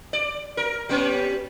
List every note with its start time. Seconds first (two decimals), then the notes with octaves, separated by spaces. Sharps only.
0.13 D5
0.57 A#4
0.89 G3 B3 C#4